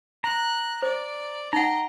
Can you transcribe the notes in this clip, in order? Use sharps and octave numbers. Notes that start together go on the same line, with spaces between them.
A#5 F#6
C5 D5
D#4 D#5 F#5 G5 A#5